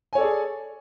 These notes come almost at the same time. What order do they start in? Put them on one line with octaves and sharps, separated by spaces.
G#5 C#5 A4 D5 G#4